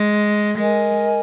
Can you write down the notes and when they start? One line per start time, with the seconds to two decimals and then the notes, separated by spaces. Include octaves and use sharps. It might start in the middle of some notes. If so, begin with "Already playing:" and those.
Already playing: G#3
0.57 G#3 A#4 D#5 G#5